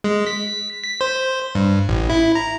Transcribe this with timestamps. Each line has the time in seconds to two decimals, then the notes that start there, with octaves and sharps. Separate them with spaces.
0.04 G#3
0.27 B6
0.84 B6
1.01 C5
1.55 G2
1.89 A1
2.10 E4
2.35 A#5